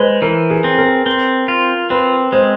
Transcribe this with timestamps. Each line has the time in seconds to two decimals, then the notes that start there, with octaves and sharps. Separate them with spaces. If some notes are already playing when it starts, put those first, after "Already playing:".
Already playing: G#3 B4 C5
0.22 E3 A#4
0.50 G#4
0.64 C4
0.78 A#4
1.06 C4
1.48 F4
1.90 C4 B4
2.32 G#3 C5